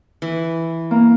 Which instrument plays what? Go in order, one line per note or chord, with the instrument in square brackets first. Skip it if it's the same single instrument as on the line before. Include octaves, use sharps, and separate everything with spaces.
[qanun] E3
[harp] A#3 A#5